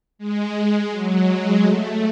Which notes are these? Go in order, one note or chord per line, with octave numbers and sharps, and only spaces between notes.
G#3
G#3
F#3
G#3
A3